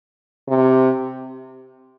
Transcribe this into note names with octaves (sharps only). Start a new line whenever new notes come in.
C3